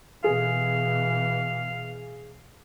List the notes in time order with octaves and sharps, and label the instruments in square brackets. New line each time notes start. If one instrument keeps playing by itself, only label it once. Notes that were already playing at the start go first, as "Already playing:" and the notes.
[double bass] B2 E3 [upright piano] G#4 [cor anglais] F5